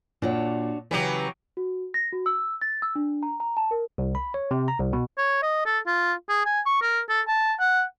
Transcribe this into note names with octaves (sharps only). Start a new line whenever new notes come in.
A#2 D4 F#4 C#5
C#3 E3 F#3 G4 B4 B6
F#4
A#6
F#4
E6
A6
E6
D4
A#5
A#5
A5
A#4
C2
B5
C#5
C3
A#5
C2
B2
C#5
D#5
A4
F4
G#4
G#5
C#6
A#4
A4
A5
F#5